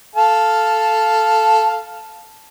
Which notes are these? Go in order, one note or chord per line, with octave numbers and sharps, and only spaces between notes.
A4 F5 A5